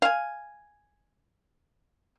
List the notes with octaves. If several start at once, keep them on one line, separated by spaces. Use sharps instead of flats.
F5 G#5